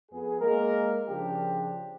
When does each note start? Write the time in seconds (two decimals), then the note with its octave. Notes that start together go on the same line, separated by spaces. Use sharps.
0.10 F2 B3 G#4
0.39 G#3 A#3 A#4
1.09 C#3 F3 D4 G4